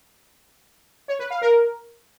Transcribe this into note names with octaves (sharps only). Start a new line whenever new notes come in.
C#5
B4
F5
A#4